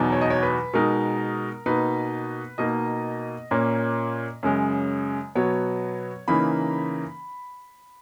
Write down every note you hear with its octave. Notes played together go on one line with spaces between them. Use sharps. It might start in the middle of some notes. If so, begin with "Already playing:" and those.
Already playing: E2 B2 F#3 B3 D#4
C#5
D#5
C#5
B4
B2 G#3 D#4 A#4
B2 A#3 D#4 B4
B2 A#3 D#4 D#5
A#2 A#3 C#4
F#2 C#3 G#3
B2 F#3 B3 C#5
C#3 E3 A#3 D#4 B5